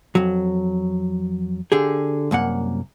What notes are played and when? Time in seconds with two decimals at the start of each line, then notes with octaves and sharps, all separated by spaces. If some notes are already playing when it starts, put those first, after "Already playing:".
0.15 F2 F#3
1.72 D3 G4 G#4
2.31 C2 F#2 A#3 F#5